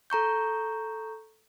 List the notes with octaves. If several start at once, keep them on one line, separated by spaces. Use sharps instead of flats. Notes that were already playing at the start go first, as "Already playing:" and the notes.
A4 A#5 C#6 G6